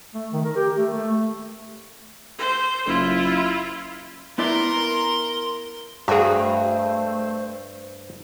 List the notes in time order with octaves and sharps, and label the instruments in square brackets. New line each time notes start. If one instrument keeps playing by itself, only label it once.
[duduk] A3
D#3
A#4
G4
A3
A3
[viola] C5
[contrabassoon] F#1 [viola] E4 F4
[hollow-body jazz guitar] B3 E4 D5 [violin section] A#4 [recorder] C6
[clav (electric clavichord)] G2 [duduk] A3 [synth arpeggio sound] F#4 G#4 [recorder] C5